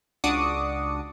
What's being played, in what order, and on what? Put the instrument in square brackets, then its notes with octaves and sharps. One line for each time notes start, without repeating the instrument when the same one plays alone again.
[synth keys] C#2 D4 F#4 D6 D#6 C#7